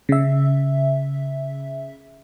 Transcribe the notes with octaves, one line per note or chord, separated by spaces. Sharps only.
C#3 E5